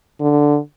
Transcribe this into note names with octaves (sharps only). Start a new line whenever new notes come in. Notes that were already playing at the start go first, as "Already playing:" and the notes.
D3